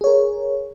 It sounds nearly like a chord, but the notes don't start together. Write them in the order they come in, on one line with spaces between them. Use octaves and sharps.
G#4 C#5 A#4